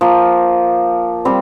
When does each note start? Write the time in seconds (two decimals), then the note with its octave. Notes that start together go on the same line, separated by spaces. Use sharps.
0.01 F3 A#3
1.25 G3 C4